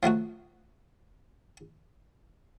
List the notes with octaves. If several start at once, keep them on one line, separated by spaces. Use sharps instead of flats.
F3 F#3 A3 F#4